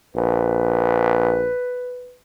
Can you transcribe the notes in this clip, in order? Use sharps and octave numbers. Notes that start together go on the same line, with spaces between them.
A#1 B4